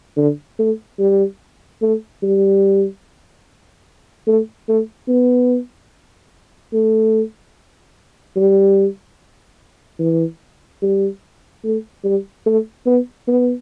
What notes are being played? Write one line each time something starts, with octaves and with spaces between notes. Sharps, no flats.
D3
A3
G3
A3
G3
A3
A3
B3
A3
G3
E3
G3
A3
G3
A3
B3
B3